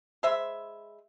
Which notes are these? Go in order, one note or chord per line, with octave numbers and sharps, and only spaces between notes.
G#3 C5 E5 B5